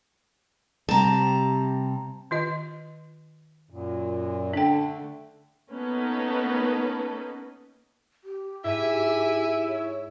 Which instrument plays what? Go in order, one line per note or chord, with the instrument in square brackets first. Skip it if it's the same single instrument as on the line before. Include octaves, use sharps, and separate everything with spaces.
[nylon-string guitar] C3 G3 C4 [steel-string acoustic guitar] A5 A#5
[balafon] D#3 F4 D#5
[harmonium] F#2 A#2
[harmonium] D3 A3 [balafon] D4 G5
[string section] A#3 B3 C#4 D#4 A4 B4
[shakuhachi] G4
[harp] G#2 [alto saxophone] E4 [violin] E5 G#5
[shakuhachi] C#5